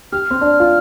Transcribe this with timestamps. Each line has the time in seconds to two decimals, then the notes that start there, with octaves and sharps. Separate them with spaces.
0.12 G4 F6
0.31 C4
0.41 D4
0.60 F4